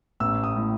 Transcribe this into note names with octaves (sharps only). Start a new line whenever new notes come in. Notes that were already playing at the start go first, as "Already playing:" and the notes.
A1 E6
D#6
A2